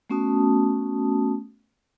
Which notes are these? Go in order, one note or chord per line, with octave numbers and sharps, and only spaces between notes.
A3 B3 C#4 F#4 A5 D#6